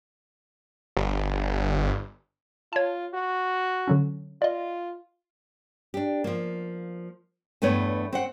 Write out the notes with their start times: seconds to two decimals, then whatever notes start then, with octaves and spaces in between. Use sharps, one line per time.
0.97 G1
2.73 F4 C#5 A5
3.14 F#4
3.88 D3 F#3 C#4
4.42 F4 D5 D#5
5.94 D4 G4
6.24 F3 A#3
7.62 E2 G2 A3 B3 B4 C#5
8.13 C4 C5 F#5